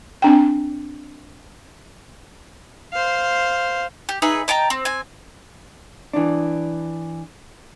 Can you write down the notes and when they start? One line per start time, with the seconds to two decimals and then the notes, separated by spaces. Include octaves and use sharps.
0.22 C4 D4 G5
2.93 C5 F5
4.09 G4
4.22 D#4 G#4 B4 E5
4.48 D#5 G5 A5 A#5
4.70 C4
4.85 C4 G#5
6.13 E3 D4